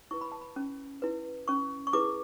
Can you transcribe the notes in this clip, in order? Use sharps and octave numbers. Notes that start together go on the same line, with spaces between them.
E4 B4 C#6
B5
A5
B5
C#4
E4 B4
C#4 C#6
C#6
E4 G#4 B4 D6